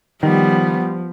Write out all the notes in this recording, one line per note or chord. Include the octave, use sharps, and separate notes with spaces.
D#3 F3 G3 B3